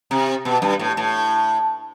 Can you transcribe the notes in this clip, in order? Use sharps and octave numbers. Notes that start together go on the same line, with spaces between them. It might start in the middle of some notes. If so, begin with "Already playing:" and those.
C3
B2
G2
A2
A2